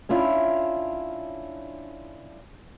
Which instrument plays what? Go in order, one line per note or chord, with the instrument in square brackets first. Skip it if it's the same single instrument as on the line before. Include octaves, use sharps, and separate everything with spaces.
[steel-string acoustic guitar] C#4 D4 E4 F4